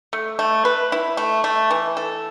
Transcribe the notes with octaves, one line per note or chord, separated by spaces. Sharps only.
A3
A3
B4
E4
A3
A3
E3
A4